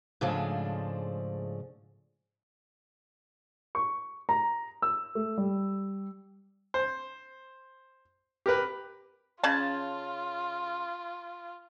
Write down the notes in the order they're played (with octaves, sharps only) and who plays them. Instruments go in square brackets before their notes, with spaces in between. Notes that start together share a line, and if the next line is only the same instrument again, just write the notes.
[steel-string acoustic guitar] G#2 C#3 F3 G#3 A3 D4
[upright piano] C#6
A#5
E6
A3
G3
[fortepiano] C5
G4 A#4 B4
[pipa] C#3 A5 [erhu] F4